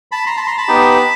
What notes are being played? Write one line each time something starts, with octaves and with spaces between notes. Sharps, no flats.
A5 B5
A#5 C6
A5 B5
A#5 C6
A5 B5
B3 D#4 G4